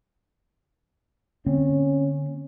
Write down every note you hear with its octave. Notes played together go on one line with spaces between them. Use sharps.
D3 A#3 C4 C#4